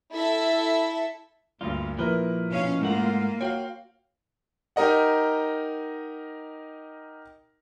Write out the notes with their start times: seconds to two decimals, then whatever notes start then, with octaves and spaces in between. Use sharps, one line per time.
0.11 E4 A4 E5
1.61 D2 G2 A#3 F4
1.99 A#2 F3 E4 A#4 B4
2.49 B2 C#4 F5
2.81 G#2 A3 A#3 F4 F#5
3.41 F#4 C#5 F5 G5
4.76 D#4 G4 A#4 D#5 F#5